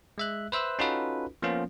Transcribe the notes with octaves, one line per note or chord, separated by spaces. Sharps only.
G#3 E5 F#6
B4 C5 E5 E6 F#6
C#4 D#4 F4 F#4 A4 B4
F3 A#3 B3 C#4 F4